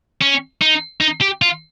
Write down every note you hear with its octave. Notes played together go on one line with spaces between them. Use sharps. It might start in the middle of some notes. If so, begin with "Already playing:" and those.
C#4
D#4
D#4
G4
F4